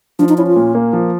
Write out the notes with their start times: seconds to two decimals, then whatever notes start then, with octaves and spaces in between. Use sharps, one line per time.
0.19 F3 D4
0.29 D#4
0.38 C#4 E4
0.47 F4
0.56 A#2
0.75 A#3
0.93 F3